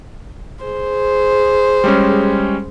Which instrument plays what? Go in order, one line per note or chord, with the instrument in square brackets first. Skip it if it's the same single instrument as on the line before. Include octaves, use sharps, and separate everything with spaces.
[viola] G#4 C5
[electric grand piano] G3 G#3 C#4